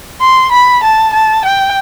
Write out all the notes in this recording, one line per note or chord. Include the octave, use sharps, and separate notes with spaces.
C6
B5
A5
A5
G5